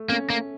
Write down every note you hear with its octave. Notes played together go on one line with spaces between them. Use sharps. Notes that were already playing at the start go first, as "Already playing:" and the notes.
Already playing: A3
A#3 C#4
A#3